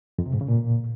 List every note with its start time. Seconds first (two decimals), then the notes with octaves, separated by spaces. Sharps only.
0.18 F2
0.26 C3
0.33 G#2
0.41 C#3
0.48 A#2